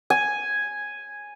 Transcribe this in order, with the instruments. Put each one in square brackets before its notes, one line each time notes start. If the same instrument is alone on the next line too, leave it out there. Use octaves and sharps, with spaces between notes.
[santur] G#5